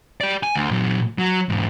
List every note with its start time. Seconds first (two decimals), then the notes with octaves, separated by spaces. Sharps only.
0.21 G4 D5
0.43 G#5
0.55 D2
0.71 A#2 F#3
1.18 F#3
1.49 E2 G#2